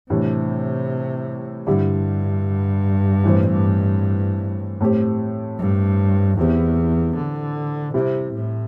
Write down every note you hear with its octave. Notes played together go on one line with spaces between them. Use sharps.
A2 C3 E3 G3 D4
G2 D3 G3 E4 G4
A2 E3 C4
A2 A3 C4 G4
G2
E2 E3 C4 G4
D3
C3 G3 C4 E4 G4
A2